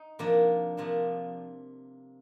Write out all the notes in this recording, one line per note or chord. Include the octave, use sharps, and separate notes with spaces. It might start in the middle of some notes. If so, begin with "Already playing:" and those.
Already playing: D#4
C3 F3 A#3 D4
C3 F3 A#3 D4